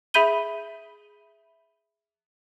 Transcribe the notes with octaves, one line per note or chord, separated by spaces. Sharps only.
G#4 E5 B5 G6 D#7 G7